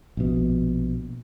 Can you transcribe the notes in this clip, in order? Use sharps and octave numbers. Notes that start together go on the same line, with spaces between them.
A#1 B2